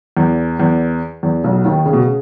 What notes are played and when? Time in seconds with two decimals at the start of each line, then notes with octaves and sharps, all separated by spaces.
0.17 E2
0.60 E2
1.23 E2
1.44 B1 B2
1.65 D#2 D#3
1.86 C#3
1.93 B2
2.00 C#3